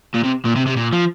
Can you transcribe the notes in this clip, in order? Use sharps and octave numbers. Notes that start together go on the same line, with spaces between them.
A#2
C3
A#2
C3
C3
A#2
F3